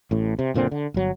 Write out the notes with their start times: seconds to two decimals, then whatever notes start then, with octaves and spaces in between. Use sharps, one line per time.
0.11 A1 A2
0.39 C3
0.54 F#1 A#2 D3 C4
0.71 D3
0.94 G1 F#3